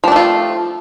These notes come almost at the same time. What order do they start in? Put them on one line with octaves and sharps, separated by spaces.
F3 D4 A3 F4 C4